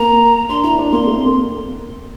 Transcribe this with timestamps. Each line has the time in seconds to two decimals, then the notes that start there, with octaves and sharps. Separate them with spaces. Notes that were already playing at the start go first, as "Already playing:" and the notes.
Already playing: A#3 A#5
0.49 D4 C6
0.63 E4 A#5
0.78 D4
0.92 A#3 C6
1.07 A3
1.16 C4
1.26 A#3